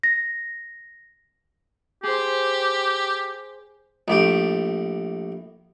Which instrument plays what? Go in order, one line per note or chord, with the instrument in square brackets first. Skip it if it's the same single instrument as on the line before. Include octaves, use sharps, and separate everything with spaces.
[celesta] A#6
[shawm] G4 [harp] G#4 C5
[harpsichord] A#1 A2 G4